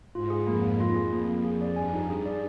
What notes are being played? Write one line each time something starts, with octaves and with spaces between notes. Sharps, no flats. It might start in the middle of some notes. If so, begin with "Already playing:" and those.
G#2 F4
G#4
F2 A#3
A#3
F4
G#4
F2 A#3
A#3
G#4
D5
G2 G#5
D#4
G2 G#4
D5